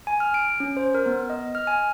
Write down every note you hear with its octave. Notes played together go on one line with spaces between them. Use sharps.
G#5
F6
D7
C#4
C5
A#4
B3
D#5
F6
G#5